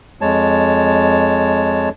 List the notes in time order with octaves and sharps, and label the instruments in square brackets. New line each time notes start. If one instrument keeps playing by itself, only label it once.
[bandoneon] F2 G#3 C#5 A5